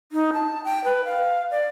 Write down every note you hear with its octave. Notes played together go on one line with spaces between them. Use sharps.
D#4
A5
G5
B4
F5
D5